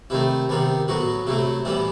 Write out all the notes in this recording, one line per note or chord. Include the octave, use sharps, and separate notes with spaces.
C3 D#3 A3 E4
C3 D#3 G3 B3
A2 F#3 B3 F#4
C3 F#3 A3 E4
A2 E3 G3 B3 E4